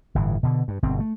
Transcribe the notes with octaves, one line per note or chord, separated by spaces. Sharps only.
G1 A2 E3
B2 D3
G2
G1 B2 C4
A3